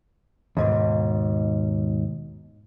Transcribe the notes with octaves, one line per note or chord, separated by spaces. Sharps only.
D#2 G#2 B2